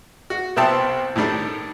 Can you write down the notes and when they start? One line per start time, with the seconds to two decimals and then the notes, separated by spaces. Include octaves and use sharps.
0.30 F#4
0.56 C2 B3 C4 E5 G5 A5
1.16 A2 D#3 G3 D4 A4